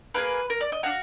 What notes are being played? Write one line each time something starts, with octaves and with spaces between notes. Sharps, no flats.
A#3 D4 G#4 B4
A#4
D5
D#5
D4 F#4 F5